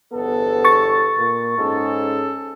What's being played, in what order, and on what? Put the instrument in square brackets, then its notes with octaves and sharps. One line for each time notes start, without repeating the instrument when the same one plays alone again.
[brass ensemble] G1 E2 A4 [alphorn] B3
[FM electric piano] C#6 A6
[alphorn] A#2
[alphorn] G#2 [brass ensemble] C#4 G#4 A4